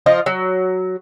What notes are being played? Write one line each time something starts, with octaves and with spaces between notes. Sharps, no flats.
F3 F4 D#5
F#3